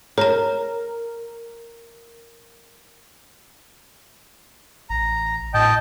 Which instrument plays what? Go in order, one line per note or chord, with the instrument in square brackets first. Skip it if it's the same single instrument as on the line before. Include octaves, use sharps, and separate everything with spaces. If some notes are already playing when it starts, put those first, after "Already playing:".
[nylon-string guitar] A#4 [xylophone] C#5 A#5
[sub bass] A1 [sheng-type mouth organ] A#5
[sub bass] A2 [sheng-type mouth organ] D#5 G5 A5